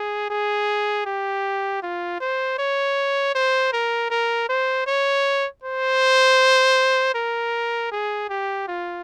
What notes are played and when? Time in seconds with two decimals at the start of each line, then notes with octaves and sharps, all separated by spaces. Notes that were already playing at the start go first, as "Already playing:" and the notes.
Already playing: G#4
0.30 G#4
1.06 G4
1.83 F4
2.20 C5
2.58 C#5
3.35 C5
3.73 A#4
4.11 A#4
4.49 C5
4.87 C#5
5.64 C5
7.15 A#4
7.91 G#4
8.29 G4
8.68 F4